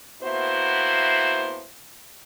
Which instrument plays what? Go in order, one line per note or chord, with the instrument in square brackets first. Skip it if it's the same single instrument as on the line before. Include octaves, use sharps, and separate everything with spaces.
[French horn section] A2 A#3 B3 E4 F#4 C5